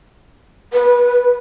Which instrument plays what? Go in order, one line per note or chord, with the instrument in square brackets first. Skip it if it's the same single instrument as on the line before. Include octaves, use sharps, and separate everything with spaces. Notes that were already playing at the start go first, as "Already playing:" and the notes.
[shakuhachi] B4